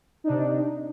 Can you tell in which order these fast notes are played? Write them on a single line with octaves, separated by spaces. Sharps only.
D#4 D4 C3